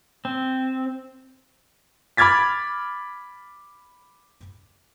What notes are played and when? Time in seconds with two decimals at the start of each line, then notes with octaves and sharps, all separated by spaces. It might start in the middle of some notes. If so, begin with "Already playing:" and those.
0.25 C4
2.17 B5 D6 F6 G#6 A6 B6